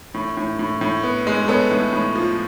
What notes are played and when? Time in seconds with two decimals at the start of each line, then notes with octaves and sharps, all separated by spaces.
0.14 A2
0.37 A2
0.59 A2
0.81 A2
1.03 B3
1.27 G#3
1.48 B3 A4 C#5
1.71 A2
1.93 A2
2.16 F3